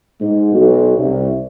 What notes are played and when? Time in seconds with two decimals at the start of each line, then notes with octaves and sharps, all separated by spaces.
0.21 G#2
0.53 B1
0.98 C2